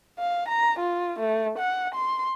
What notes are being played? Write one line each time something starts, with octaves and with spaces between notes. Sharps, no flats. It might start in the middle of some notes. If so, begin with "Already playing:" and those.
F5
A#5
F4
A3
F#5
C6